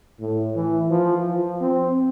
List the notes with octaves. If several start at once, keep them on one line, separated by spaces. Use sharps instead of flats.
A2
E3
F3
F3
C4